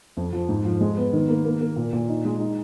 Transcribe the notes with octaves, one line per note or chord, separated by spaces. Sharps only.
F2
F3
G#2
F3
G#3
B3
D#3
A#3
A#3
A#3
A#2
A#2
D#4
G#3
D#4